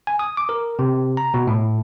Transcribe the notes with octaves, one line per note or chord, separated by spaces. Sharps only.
G#5
D#6
D6
A#4
C3
A#5
B2
A2